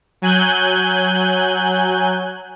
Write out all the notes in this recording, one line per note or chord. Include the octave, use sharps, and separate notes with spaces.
F#3 G#5 F#6 G6